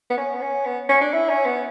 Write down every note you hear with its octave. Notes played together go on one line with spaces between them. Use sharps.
B3
C#4
B3
C#4
B3
C#4
D4
E4
C#4
B3